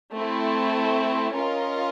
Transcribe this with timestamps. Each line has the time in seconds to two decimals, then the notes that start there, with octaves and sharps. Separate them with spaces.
0.15 A3 C4 E4
1.34 C#4 F4 A#4 D#5